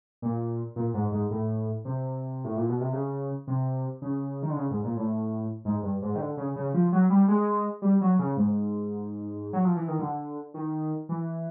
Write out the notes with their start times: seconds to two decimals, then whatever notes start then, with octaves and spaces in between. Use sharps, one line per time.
0.22 A#2
0.76 A#2
0.94 G#2
1.12 G#2
1.31 A2
1.85 C3
2.44 A2
2.57 A#2
2.69 B2
2.81 C3
2.93 C#3
3.47 C3
4.02 C#3
4.42 D#3
4.50 D3
4.57 C#3
4.71 G#2
4.84 A#2
4.97 A2
5.65 G#2
5.83 G2
6.02 G#2
6.15 D#3
6.19 D3
6.37 C#3
6.56 C#3
6.74 F3
6.93 F#3
7.10 G3
7.28 G#3
7.82 G3
8.01 F#3
8.19 C#3
8.37 G#2
9.53 F#3
9.65 F3
9.76 E3
9.88 D#3
9.99 D3
10.54 D#3
11.09 E3